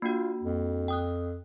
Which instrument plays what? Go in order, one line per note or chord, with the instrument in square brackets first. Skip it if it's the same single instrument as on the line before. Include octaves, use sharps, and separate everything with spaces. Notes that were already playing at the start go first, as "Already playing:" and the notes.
[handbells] A#3 D4 F#4 [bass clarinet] F4
[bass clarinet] F2
[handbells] G5 D#6 F#6